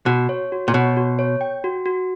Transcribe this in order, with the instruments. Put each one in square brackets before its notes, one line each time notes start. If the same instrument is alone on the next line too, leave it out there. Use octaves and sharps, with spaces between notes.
[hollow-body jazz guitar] B2 [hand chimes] F#4
[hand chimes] C#5
F#4
[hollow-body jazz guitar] A#2
[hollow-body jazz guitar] B2 [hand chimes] C#5
[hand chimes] F#4
C#5
G5
F#4
F#4